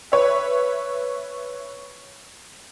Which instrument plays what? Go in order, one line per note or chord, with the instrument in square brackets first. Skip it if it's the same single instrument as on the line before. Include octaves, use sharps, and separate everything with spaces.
[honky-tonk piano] B4 C#5 E5